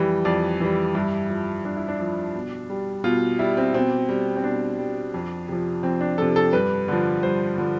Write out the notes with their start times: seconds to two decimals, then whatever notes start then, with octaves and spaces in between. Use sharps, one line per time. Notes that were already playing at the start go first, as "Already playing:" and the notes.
Already playing: F2 E3 G3
0.25 F2 D5
0.60 E3 G3
0.95 G2 E4
1.30 F3
1.65 G2 D4
1.77 E4
1.88 D4
2.00 F3
2.35 B2
2.70 G3
3.04 B2 F4
3.39 G3 E4
3.57 C4
3.74 B2 C4
4.09 G3
4.36 C4
4.44 B2 D4
4.78 G3
5.14 F2
5.48 C3 F3
5.83 F2 C4
6.01 D4
6.18 C3 F3 A4
6.36 A4
6.53 G2 B4
6.88 D3 F3
7.23 G2 C5
7.58 D3 F3